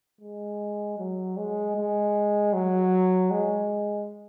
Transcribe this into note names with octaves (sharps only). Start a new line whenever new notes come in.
G#3
F#3
G#3
G#3
F#3
G#3